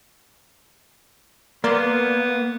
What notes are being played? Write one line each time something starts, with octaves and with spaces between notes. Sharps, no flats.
A#3 B3 A#4 D5 C6